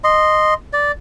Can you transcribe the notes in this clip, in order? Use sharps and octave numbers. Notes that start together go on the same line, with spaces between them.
D#5 C6
D5